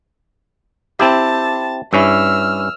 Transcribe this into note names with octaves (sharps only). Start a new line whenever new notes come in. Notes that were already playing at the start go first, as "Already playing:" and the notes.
C4 E4 G4 A5
G2 C#4 E4 E6 F6